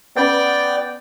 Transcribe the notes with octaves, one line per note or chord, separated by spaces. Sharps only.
B3 C#4 B4 D5 G5